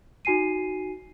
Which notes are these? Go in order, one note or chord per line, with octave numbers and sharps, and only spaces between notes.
D#4 F#4 G#5 C7 D#7